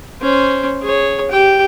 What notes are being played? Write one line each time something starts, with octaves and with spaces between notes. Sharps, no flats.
C#4 C5
G#4 C#5
G4 G5